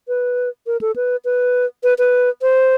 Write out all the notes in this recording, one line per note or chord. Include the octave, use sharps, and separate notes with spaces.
B4
A#4
A4
B4
B4
B4
B4
C5